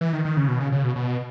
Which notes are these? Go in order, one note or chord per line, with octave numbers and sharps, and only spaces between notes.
E3
D#3
D#3
C#3
B2
C#3
C#3
B2
B2